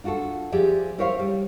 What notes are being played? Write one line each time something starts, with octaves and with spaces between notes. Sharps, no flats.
D4 F4 F#4 G#4 A4
F3 G4 G#4 D5 E5
E4 A#4 C5 C#5 E5 F5
G3